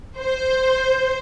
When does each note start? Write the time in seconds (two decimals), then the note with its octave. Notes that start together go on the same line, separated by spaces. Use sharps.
0.18 C5